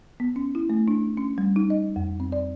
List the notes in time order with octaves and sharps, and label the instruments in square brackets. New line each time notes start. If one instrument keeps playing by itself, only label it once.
[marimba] B3
C#4
E4
A3
D4
C#4
G3
D#4
D#5
F2
C4
D5